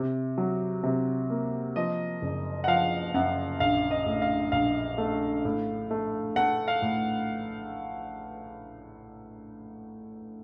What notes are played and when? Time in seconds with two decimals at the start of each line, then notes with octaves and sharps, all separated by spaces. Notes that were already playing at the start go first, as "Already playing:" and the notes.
Already playing: C3
0.38 F#3
0.83 C3
1.30 A#3
1.76 F3 D#5
2.22 F#1
2.64 F#5
2.68 F3 F5
3.14 F#2 F#5
3.60 A#1 F5
3.91 D#5
4.06 A2
4.22 F5
4.52 A#1 F5
4.98 A3
5.45 A2
5.91 A3
6.36 A3 F#5
6.68 F5
6.82 A2